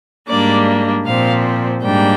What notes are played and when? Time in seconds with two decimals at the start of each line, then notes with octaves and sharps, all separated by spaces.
0.28 G#2 G3 A#3 D4 D5
1.05 A#2 F3 C4 F5
1.83 G#2 G3 A#3 D4 G5